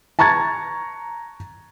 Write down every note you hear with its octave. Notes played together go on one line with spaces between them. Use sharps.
A5 A#5 C#6 G#6 A6